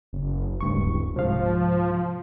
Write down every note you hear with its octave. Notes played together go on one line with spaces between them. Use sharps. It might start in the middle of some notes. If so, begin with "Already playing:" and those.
F#1
D1 C#2 G2 C#6
C2 G#2 F3 F5